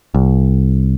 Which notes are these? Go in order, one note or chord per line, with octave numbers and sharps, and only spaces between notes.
C2